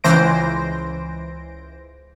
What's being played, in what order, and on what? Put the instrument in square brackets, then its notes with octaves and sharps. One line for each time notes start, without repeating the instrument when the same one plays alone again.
[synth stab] C#2 E3 C5 A#6 D7